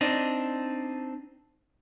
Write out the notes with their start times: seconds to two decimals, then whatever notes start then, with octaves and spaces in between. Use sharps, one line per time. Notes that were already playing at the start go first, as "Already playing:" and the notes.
0.01 C4 D4 D#4